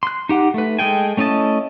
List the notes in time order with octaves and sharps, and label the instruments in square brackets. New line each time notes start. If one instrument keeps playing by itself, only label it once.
[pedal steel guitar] C6 F#6
D#4 G4 F#5
A3 B4
G#3 A4 G5 G#5
A3 C#4 E4 D#5 A5